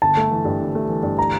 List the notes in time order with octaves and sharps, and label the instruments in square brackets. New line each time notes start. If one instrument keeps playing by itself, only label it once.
[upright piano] G1 [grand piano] A5
[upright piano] A3
E3
G2
G1
A3
E3
G2
[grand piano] A#5